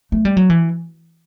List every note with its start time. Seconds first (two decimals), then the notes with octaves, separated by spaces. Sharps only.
0.12 A3
0.25 G3
0.37 F#3
0.50 E3